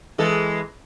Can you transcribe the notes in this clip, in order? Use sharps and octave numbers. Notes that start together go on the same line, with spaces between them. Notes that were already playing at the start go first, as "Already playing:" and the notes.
E3 G#3 A4